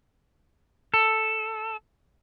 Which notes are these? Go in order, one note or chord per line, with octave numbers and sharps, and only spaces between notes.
A4